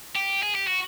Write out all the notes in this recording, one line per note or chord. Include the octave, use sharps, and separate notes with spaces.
G4
G#4
G4
F#4